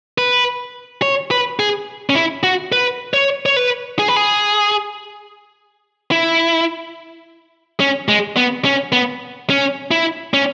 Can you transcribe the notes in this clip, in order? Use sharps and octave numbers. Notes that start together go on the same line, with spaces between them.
B4
C#5
B4
G#4
C#4
E4
F#4
B4
C#5
C#5
B4
G#4
B4
G#4
E4
C#4
G#3
B3
C#4
B3
C#4
E4
C#4